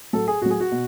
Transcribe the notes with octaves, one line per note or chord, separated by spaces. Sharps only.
A2 F#3 A4
G#4
A2 F#3 F#4 G#4
F#4
B2